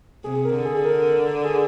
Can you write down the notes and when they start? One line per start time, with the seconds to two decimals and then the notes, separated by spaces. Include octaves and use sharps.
0.24 C3 G#4
0.44 A#4
0.55 D3
0.65 G#4
0.84 A#4
1.44 G#4